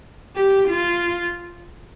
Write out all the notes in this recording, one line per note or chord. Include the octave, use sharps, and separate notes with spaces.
G4
F4